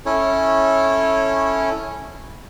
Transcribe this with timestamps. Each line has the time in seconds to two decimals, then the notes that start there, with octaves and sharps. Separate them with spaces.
0.06 C#4 E4 A4 C#5